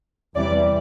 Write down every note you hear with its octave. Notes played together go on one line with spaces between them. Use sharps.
E2 C3 E3 G3 D5